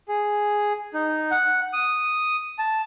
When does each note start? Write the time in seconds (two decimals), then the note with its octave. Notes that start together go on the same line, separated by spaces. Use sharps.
0.08 G#4
0.94 D#4
1.31 F#5
1.73 D#6
2.59 A5